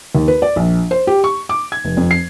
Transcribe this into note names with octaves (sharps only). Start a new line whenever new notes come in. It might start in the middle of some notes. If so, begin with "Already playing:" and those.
D#2
B4
D5
A#1
C5
G4
C#6
D6
G#6
F1
F2
C7